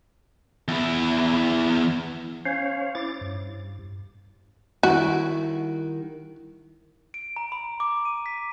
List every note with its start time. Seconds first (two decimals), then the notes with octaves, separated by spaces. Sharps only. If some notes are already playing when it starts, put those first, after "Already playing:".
0.68 E2 E4
2.46 C#4 C5 C#5 F5
2.95 E4 D6 A6
3.21 G2
4.83 D#3 G3 E4 F#4
7.14 D7
7.36 A#5
7.52 B5
7.80 D6
8.05 D#7
8.26 B6